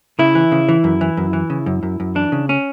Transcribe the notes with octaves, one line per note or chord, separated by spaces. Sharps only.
C#3 E4
E3
C#3
E3
F#2
E3
F#2
E3
C#3
F#2
F#2
F#2
E3 D4
C#3
C#4